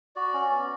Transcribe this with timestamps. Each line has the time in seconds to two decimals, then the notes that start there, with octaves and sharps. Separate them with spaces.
0.16 F#4 D5
0.34 C#4
0.51 B3